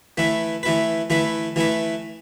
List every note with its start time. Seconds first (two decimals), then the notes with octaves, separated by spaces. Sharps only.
0.17 E3 A3 E4 B4
0.63 E3 A3 E4 B4
1.10 E3 A3 E4 B4
1.56 E3 A3 E4 B4